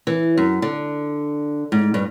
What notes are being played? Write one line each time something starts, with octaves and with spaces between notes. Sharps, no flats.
E3
F#2
D3
G#2
G2